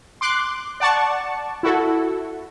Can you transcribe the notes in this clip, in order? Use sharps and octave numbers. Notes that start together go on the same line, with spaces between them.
C6 D6 F#6
D5 F#5 A5 C#6
E4 F#4 A4